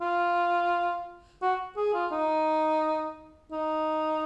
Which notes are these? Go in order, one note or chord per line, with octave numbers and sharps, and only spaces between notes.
F4
F#4
G#4
F4
D#4
D#4